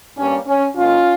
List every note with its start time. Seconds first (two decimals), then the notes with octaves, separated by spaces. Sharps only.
0.17 G2 G3 A#3 C#4
0.47 C#4
0.76 G#2 D#3 A#3 C#4 F4